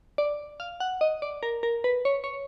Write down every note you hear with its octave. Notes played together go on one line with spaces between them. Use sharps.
D5
F5
F#5
D#5
D5
A#4
A#4
B4
C#5
C#5